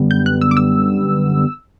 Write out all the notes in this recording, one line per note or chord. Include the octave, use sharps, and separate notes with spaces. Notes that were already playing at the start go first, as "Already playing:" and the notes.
Already playing: F#2 D3 G3 B3
G6
F#6
E6
D6
E6